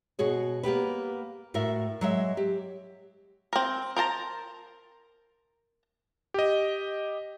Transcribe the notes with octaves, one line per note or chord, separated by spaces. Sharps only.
B2 F#4 G#4 C#5
A#3 B3 G4 B4
A2 F#4 A#4 E5
F#3 G#3 E5
G4
C4 A#4
A#4 C5 A5 A#5
G4 D#5